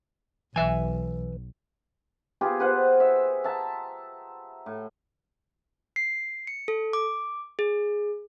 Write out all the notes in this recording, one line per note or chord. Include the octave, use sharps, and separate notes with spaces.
B1 E3 E5 G#5
B3 F4 G4 G#4
F4 B4 C5 F#5
E5
E5 A5 A#5
A2
C7
C#7
A4
D6
G#4